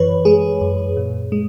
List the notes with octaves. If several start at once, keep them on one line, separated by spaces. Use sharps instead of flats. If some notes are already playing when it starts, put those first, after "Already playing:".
Already playing: F#2 E3 B4 C#5
G#3 G#4
F#2
A#2
G#3